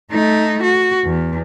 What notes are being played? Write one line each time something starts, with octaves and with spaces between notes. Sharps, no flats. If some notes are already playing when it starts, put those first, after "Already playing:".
A3 D#4
F#4
E2